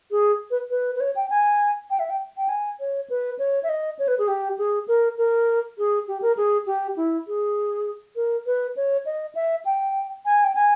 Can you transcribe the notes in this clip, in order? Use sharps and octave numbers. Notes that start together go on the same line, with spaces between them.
G#4
B4
B4
B4
C#5
G5
G#5
G5
E5
G5
G5
G#5
C#5
B4
C#5
E5
D#5
C#5
B4
G#4
G4
G#4
A#4
A#4
G#4
G4
A#4
G#4
G4
E4
G#4
A#4
B4
C#5
D#5
E5
G5
G#5
G5
G#5